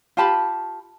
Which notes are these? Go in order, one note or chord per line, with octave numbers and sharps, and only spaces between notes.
F4 G4 A5 B5